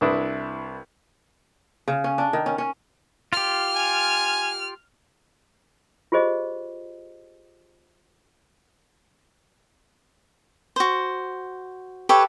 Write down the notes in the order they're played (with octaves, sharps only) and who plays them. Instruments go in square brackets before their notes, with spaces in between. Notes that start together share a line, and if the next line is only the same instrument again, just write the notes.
[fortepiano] C2 D4 E4 B4 D#6 F#6
[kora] C#3
C#4
D4
D#3
C#4
C#4
[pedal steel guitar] F4 G4 [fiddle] F6
[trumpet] G#5
[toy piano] F4 G4 G#4 C5 D#5
[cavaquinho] F#4 C5
G4 A4 B4 C#5